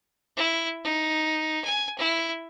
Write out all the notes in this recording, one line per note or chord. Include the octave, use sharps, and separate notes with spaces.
E4
D#4
G#5
E4